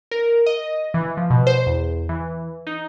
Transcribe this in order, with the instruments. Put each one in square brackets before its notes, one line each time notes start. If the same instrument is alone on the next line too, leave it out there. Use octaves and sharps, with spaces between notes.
[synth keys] A#4
D#5
E3
F3
B2
C5
E2
E3
D#4